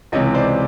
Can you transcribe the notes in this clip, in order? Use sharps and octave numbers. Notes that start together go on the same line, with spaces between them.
C#2 C3 E3 C#5 D#5
C5 D5